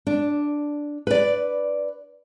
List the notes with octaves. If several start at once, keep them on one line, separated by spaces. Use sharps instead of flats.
D4
B4 D5